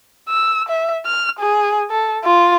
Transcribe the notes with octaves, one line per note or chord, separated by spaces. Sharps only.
E6
E5
F6
G#4
A4
F4